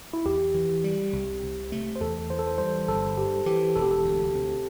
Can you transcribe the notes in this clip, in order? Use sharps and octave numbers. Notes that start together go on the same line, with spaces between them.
E4
E2 G4
E3
G3
C2
C3
A3
C5
E2 A4
E3 C5
A4
C5
G3 C5
G1 A4
G2 G4
E3 G4
E1 A4
G4
A4
D2
C3